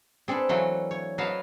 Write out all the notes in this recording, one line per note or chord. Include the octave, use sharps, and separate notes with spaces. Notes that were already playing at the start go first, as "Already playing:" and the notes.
C4 D4 G#4 A4 B4
E3 F#3 A3 F5
C#5
F#3 B4 D#5 F5 A5